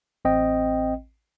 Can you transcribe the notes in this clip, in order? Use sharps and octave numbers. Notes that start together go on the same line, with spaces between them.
A1 C4 D#5 G5